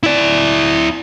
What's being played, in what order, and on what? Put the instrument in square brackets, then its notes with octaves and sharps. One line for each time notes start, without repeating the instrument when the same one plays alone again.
[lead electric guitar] E4 D5